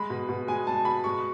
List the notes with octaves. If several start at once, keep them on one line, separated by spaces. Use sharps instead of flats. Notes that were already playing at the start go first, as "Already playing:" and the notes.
Already playing: G#3 B5
B2
B2
G#3 G#5
G#3 A5
B2 B5
G#3 C#6